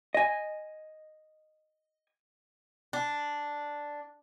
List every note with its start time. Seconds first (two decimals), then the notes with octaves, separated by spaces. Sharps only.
0.14 D#5 G#5
2.93 D4